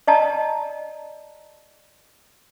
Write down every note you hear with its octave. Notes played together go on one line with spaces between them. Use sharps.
D5 D#5 A5 A#5